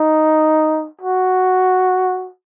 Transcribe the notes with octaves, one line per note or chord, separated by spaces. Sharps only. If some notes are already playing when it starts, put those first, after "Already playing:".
Already playing: D#4
F#4